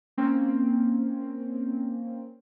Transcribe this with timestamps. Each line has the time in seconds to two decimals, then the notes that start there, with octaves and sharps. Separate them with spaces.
0.17 A#3 C4 C#4